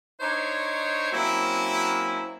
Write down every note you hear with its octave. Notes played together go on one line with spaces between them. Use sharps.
D4 D#4 C5 C#5
F#3 A#3 C4 C#4 E4